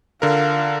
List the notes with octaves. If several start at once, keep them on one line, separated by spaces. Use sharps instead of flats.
D3 F4 A#4 F5